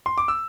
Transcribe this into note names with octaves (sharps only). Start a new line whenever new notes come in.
C6
D6
E6